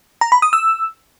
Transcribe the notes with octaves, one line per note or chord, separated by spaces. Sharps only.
A#5
B5
D#6
E6